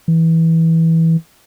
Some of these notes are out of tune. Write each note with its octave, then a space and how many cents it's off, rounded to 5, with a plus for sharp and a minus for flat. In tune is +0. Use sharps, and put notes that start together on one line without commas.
E3 -15